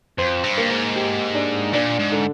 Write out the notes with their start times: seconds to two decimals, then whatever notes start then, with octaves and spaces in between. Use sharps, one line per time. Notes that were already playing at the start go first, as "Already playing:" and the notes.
0.18 F2 C5
0.44 G2
0.58 A#3
0.70 G#2
0.96 G4
1.35 D4
1.73 A#2 D4
1.99 G#2
2.12 D3